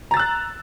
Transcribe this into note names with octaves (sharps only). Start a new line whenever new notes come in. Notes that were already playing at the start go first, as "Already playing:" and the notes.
A#5 E6 F#6 A6